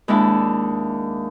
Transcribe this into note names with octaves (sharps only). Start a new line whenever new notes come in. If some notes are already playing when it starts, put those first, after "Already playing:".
D#2 G#3 D4 E4 A5